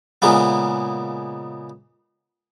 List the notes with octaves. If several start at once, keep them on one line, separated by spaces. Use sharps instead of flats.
A#2 C#3 G#3 A#3 B3